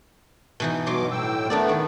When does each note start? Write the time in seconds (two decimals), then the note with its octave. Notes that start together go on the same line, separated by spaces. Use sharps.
0.60 B2 E3 D#4
0.86 G2 B2 F#3 C6 D6
1.11 A2 G5 E6
1.50 A3 B3 D4 A#4 D5
1.69 D#3